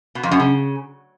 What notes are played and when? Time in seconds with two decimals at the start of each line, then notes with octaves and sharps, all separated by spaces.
0.15 B2
0.23 F2
0.32 F#2
0.40 C#3